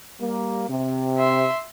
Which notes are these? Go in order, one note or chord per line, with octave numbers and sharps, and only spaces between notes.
G3 A#3
C3
E5 C6